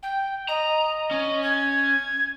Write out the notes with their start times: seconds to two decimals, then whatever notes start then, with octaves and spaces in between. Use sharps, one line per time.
0.03 G5
0.48 D#5 A#5
1.11 C#4
1.43 G#6